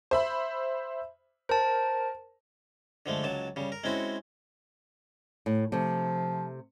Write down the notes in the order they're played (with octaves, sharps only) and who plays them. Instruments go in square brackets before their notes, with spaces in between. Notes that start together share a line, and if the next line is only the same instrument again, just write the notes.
[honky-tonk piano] C5 E5 B5
[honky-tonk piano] A#4 [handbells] C5 A5
[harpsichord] D3 F3 G#3 A3
C#2 F#3 A5
C#3 G3
A#4
G#3 C4 C#4 E4 F#4
[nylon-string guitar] A2
[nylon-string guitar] C3 A3 [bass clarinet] F3